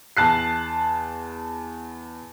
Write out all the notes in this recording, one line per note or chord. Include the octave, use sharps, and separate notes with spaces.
E2 A5 F#6 C7